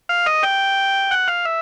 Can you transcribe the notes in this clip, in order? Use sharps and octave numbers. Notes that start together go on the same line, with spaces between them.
F5
D#5
G5
F#5
F5
E5